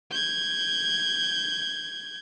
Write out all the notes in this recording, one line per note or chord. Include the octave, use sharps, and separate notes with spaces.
G6 G#6